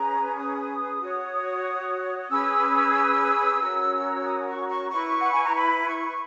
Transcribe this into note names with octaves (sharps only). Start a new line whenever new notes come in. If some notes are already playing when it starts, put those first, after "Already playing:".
Already playing: C#4 G#4 B4 A#5
D#6
F#4 C#5
C#4 G#4 B4 E6
C#4 F#4 A#4 C#5
D#6
C#6
C#6
E4 B4 C#6
F#5
G#5
A#5
B5
C#6